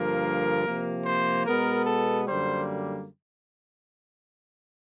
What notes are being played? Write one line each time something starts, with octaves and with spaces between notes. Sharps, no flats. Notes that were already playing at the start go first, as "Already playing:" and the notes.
Already playing: G2 D3 F3 A#3 A#4
C3 F3 A#3
C5
B2 G#3 B3 A#4
A4
F#2 D3 G3 A#3 C5